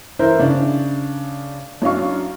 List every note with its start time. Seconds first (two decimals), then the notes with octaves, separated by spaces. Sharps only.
0.19 E3 A#4 C5 E5 G6
0.39 C#3 D4
1.82 F#2 F#3 D4 F5 C#6